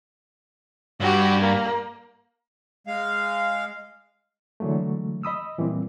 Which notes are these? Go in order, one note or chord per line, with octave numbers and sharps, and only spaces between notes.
G2 F#4 G4
A#3
G#3 F5
D3 E3 F#3 G#3 A3
D#5 B5 D#6 E6
A#2 E3 G3 A#3 C4